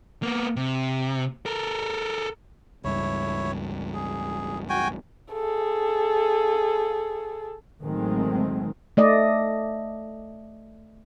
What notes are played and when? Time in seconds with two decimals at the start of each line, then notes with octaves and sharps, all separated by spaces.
0.23 A#3 B3
0.56 C3
1.46 A4 A#4
2.84 C#2 G2 E4 C#5
3.94 G#4
4.69 F#4 G5 G#5
5.32 G#4 A4
7.83 A1 D#3 F#3 G#3 A3 C4
8.97 A3 D5 D#5